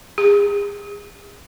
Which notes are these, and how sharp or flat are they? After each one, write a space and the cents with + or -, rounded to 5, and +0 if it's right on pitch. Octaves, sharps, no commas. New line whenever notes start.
G#4 -35